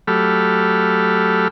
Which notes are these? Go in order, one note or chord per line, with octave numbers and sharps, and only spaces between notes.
F#3 A3 G4 A4 B5 F6